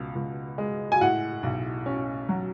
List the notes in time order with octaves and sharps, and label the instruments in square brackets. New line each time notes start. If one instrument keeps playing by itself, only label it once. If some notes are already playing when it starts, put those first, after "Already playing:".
Already playing: [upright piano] C#2 B2
C#2
G#3
G#5
A2 F#5
B1
C#4
F#3